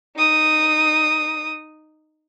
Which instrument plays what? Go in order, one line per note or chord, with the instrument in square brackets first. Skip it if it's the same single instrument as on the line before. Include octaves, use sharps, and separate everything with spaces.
[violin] D#4 D#6